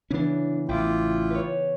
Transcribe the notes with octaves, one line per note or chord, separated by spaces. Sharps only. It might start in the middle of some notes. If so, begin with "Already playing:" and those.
C#3 E3 B3 C#4 D4
A1 E4 F4 G5 D6
B4 C#5